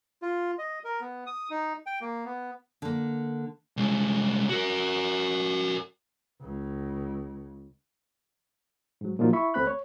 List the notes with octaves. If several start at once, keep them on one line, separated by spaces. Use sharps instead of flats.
F4
D#5
A#4
B3
D#6
D#4
G5
A#3
B3
D3 A#3
C2 G#3
F#4 A#4
C#2
G#2 F#3
A#2 F3 F#3 A#3 D#4 F4
E4 E5 B5 C#6
D2 A3 C4 B5 F#6
C#5